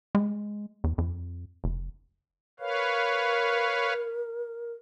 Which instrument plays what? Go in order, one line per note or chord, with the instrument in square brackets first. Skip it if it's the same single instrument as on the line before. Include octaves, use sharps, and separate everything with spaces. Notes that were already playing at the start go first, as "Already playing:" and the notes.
[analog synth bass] G#3
E2
F2
F1
[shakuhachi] A#4 [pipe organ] B4 C#5 F5